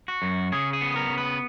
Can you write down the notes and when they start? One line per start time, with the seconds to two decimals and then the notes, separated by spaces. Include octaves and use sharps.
0.08 F#4
0.22 F#2
0.52 C#3 G#4
0.73 G#4
0.81 B3
0.96 A#4
1.09 C#3
1.18 B4